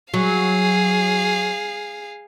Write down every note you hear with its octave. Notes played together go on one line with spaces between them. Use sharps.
F#3 G#4 F5